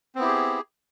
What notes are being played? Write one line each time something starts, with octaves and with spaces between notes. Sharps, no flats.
B3 C4 E4 G4 G#4